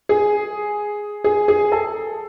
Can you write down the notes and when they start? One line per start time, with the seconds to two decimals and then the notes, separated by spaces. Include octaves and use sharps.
0.09 G#4
1.24 G#4
1.48 G#4
1.72 A4